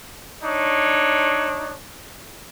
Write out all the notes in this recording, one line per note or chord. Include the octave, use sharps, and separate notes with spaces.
D4 D#4 C#5